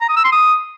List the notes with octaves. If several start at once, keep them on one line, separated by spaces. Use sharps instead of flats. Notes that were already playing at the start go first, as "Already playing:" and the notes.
A#5
D#6
E6
C6
D#6